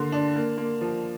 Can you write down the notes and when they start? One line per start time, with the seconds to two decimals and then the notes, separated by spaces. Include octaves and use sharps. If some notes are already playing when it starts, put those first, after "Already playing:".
Already playing: D3 A#3 C6
0.12 D4
0.36 A#3
0.57 A#3
0.81 F3